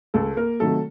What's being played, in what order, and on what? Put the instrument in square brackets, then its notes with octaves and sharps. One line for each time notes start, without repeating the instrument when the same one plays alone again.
[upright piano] C#2 A4
A#3 A#4
C3 D#3 F#3 A3 A4